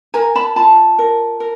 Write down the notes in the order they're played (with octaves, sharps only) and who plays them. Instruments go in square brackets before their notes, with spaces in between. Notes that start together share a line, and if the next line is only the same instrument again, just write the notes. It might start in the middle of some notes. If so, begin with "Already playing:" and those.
[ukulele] A#4 G#5 A#5
A5 B5
F4 A5 B5
A#4
A#4